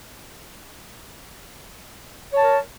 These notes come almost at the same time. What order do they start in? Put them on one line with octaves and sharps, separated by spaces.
C#5 A5 A#4